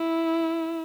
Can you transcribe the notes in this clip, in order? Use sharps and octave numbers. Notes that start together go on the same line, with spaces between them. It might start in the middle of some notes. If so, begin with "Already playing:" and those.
Already playing: E4